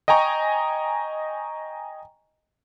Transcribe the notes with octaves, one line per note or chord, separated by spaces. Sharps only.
D#5 G5 G#5 A#5 C#6